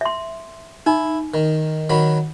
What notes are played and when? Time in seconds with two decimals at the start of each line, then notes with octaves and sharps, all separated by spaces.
0.01 E5 C6
0.86 D#4 E4
1.34 D#3
1.90 D#3 F#3 B5